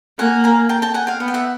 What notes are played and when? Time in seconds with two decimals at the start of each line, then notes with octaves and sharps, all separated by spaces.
0.19 A#3 F#5 G#5
0.44 G#5 A#5
0.69 G5 A5
0.82 G5 A5
0.94 F#5 G#5
1.07 F5 G5
1.20 B3 F#5
1.28 G5
1.34 E5 F#5